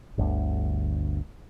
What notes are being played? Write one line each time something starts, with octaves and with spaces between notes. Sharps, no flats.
G1 D2